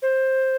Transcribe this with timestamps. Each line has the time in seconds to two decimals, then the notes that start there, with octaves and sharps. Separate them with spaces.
0.02 C5